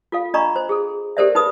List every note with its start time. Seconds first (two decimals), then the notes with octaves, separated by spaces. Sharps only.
0.12 F4 A4 F5
0.34 D4 D#5 A#5 B5 C#6
0.56 C5
0.69 G#4 A4
1.17 G4 A4 A#4 C5 D5 E5
1.35 D#4 B4 B5 D#6